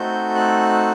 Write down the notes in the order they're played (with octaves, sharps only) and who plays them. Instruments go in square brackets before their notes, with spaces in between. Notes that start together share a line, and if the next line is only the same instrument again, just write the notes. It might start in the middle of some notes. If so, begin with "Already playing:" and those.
Already playing: [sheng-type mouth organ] A3 C4 D#4 F#4 A4 G6
F#6